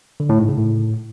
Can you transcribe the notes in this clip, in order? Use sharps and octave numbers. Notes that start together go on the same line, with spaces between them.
D3
A2
G#2
C#3
A2